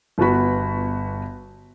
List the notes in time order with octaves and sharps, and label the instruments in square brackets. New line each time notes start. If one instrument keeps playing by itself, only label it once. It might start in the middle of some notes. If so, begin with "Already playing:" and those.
[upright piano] G1 B3 F#4 B5